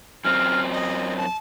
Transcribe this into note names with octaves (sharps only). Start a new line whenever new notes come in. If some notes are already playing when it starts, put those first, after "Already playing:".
F#2 C4 F6
D#5
A5